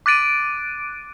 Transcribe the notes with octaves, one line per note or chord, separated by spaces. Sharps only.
D6 F#6 A6 D7 D#7